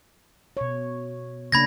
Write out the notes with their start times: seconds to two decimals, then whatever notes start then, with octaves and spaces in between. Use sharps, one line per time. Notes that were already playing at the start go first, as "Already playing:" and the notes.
0.57 B2 C#5
1.52 C#3 A#3 D4 B5 G#6 A#6